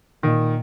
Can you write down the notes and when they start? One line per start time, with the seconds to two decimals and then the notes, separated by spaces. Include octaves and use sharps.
0.23 A#2 D#3